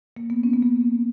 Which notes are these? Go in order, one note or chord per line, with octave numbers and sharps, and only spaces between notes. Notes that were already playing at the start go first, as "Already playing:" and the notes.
A#3
B3
C#4
B3
A#3